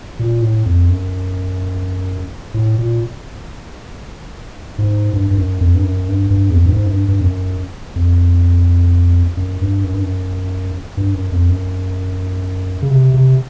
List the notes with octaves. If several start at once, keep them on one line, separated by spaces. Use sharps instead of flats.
A#2
A2
F2
F#2
A2
A#2
G#2
G2
G2
F#2
F2
G2
F#2
G2
G2
E2
F2
G2
G#2
F#2
G2
G2
F2
F#2
F2
F#2
G2
F#2
G2
F#2
G2
F#2
F2
F#2
C#3
C3
C3